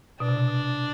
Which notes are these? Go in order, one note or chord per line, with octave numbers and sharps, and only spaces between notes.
B2 D4
C3
B2